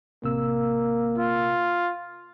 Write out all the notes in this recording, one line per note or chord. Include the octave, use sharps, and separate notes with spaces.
A1 C3 A#3 E6
F4